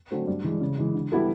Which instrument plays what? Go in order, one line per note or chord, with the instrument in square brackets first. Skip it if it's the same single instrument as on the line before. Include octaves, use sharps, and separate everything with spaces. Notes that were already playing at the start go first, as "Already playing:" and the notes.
[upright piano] D3 F#3 A3 C4
G2
E3 G#3
C#3
E3 G#3
D3
G3 B3 E4 A4